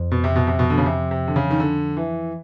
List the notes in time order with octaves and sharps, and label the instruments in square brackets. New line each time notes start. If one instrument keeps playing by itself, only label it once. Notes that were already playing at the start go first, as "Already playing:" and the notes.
Already playing: [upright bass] F2
[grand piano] B2
C3
B2
C3
B2
D3
C#3
C3
C3
D3
C#3
D#3
D3
E3